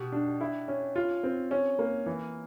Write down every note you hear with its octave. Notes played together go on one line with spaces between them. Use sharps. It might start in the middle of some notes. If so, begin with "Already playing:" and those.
Already playing: B2 G4
D4
E4
C#4
F4
C4
C#4
A#3
E3